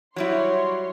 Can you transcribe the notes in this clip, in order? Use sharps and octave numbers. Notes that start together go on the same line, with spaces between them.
F#3 G3 E4 C#5 C6